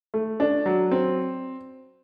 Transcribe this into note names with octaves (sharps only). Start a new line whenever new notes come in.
A3
D4
F#3
C4